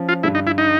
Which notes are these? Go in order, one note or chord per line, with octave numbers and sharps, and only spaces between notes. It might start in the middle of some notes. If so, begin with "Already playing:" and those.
Already playing: F3 C#4
F4
G2 D3 G3 E4
D#4
E4
D#4